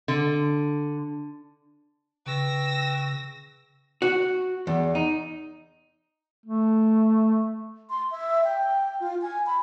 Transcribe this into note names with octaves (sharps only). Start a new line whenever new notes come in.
D3
C#3 B4 G5 C#6 E6 A#6
F#4
E2
D#4
A3
C6
E5
G5
F4
G#5
B5